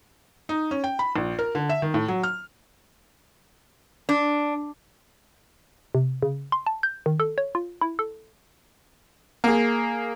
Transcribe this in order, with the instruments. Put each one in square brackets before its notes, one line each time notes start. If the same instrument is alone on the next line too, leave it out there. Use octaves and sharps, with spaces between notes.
[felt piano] D#4
C#4
G5
B5
A#1
A#4
D3
E5
D#3
A2
F#3
F6
[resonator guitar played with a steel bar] D4
[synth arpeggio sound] C3
C#3
C6
A5
G6
D#3
A4
C#5
F4
E4
A4
[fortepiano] A#3 G#4